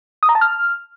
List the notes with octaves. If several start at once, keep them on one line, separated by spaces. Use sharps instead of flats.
D#6
A#5
A5
F6